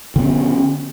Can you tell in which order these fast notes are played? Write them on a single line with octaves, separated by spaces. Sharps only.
D3 B3 C#4